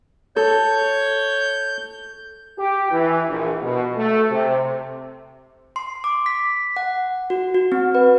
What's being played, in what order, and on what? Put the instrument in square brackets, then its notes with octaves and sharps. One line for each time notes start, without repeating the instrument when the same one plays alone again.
[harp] A4 [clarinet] C#5 [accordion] G6
[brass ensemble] G4
E3
A#1
B2
A3
C3
[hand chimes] C6
D6
B6
F#5
F#4
F#4
C4
B4